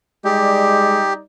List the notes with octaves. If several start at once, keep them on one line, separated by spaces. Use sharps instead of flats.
G3 G#3 D#4 G4 D5